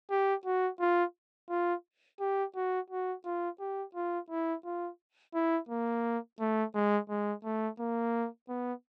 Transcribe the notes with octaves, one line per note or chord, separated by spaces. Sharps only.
G4
F#4
F4
F4
G4
F#4
F#4
F4
G4
F4
E4
F4
E4
A#3
A3
G#3
G#3
A3
A#3
B3